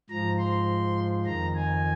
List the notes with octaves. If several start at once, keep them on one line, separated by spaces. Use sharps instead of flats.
G#2 F3 A#5
C6
F2 D#3 A#5
G#5